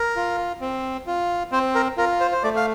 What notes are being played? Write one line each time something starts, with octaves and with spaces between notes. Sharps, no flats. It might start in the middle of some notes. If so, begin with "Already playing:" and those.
Already playing: A#4
F4
C4
F4
C4 C5
A#4
F4 A#4
C5
C5
A3 D5
F5